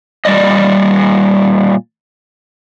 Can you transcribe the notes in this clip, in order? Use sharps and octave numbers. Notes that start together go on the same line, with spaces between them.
A#2 G3 D5 D#5